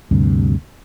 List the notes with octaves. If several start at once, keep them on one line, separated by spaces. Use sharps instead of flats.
D2 G2 C3